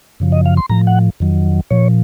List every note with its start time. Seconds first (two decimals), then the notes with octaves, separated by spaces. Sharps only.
0.20 F#2 C#3 F3
0.32 D#5
0.46 F5
0.57 C6
0.69 A2 F3 A#5
0.87 F#5
1.20 F2 D#3 F#3
1.70 A#2 F3 C#5